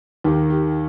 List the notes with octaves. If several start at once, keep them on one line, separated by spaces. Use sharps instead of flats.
D#2 D#3 G4
G4